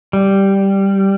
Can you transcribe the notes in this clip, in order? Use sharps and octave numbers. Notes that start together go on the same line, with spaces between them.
G3